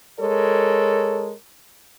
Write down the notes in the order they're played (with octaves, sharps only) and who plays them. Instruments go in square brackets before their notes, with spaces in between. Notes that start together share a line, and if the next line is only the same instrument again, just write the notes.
[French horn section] G#3 A4 A#4 C#5